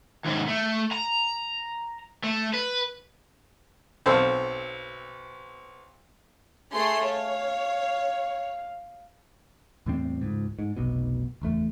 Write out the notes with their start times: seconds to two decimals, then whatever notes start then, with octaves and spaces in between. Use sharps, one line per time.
0.25 D#2 G#2
0.48 A3
0.92 A#5
2.23 A3
2.53 B4
4.06 B1 C4 A4 C5 F5 F6
6.71 A3 G#4 C6
7.04 C#5 F5
9.86 E2 A2 G3 C4
10.21 C#2 G#2
10.59 G#2
10.77 F1 B1 B2
11.42 F#1 E2 A3